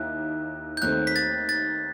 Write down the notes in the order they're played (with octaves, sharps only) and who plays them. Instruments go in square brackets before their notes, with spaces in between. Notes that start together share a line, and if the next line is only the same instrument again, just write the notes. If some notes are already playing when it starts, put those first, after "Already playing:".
Already playing: [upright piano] D#2 D#3 E4 [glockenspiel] F#6
[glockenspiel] G6
[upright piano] D#2 D#3 A3 C4 [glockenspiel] F#6
[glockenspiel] B6
A6
A6